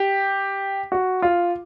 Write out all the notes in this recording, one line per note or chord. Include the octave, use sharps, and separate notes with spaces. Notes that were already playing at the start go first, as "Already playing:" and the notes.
Already playing: G4
F#4
F4